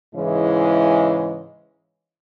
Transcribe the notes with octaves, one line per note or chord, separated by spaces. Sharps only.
G#2 C#3 E3 G#3 E4